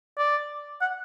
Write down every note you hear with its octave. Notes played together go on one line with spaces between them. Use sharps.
D5
F#5